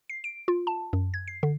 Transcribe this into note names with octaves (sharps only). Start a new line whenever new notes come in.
C7
D7
F4
A5
F#2
G#6
C7
D3